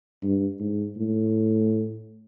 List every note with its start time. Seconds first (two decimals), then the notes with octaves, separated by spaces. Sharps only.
0.23 G2
0.60 G#2
0.96 A2